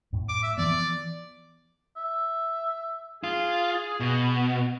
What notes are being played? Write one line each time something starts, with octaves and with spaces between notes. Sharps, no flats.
F#2 A2
D6
E5
E3 F3 B3 D5
E5
F4 G#4
B2